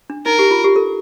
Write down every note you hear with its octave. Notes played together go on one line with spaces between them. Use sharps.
D4
D#4 A#4
G4
F4
G4
A4